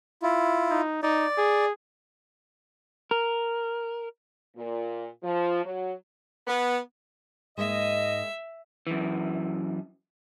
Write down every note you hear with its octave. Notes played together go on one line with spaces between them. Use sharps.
E4 F4
D#4
D#4 D5
G#4
A#4
A#2
F3
F#3
B3
G#2 G#3 A#3 D#5 E5
F#2 E3